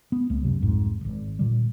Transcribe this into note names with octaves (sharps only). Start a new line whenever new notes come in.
B3
C#2 A#3
F#2 C3 F#3
C2 F2 G#2
D#1 G#1
A#2 D3 G3